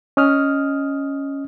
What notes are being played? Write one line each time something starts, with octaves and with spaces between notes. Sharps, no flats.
C#4 D#5 D#6 F6